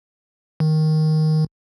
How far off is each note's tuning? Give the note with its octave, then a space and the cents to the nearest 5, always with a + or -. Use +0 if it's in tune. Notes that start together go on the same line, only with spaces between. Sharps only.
D#3 +5